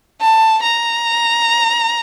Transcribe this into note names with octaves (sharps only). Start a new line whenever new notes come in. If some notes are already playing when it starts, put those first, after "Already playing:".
A5
A#5